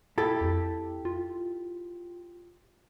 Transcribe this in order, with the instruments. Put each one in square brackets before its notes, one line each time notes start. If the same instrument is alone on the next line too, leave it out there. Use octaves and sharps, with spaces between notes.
[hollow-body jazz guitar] E4 G4 A4
[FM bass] F2
F4